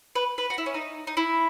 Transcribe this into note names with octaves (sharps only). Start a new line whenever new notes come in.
B4
B4
F#4
E4
C#4
D#4
D#4
E4